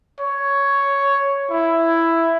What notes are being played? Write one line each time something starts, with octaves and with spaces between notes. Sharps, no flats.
C#5
E4